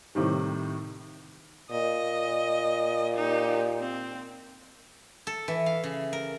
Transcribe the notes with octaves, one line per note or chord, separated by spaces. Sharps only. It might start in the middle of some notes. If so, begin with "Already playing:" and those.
A2 C3 D#3 G3
A#2 D#5
D#4 G4
C4
A4
E3
F5
C#3
A#4